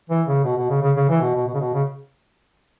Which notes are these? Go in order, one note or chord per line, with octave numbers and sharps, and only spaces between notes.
E3
C#3
B2
B2
C#3
C#3
C#3
E3
B2
B2
B2
C#3
B2
C#3